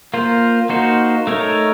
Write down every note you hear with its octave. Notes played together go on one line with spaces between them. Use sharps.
A#3 F4 C5
A#3 D#4 F#4 C5
A3 D#4 A#4 C#5